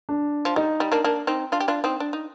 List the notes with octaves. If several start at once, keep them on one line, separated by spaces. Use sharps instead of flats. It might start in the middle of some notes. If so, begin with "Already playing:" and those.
D4
F3
G3 D#4
G3
A#3 D4
A#3 D4
C4 D#4
D4 F4
G4
D4 F4
C4 D#4
D4
D#4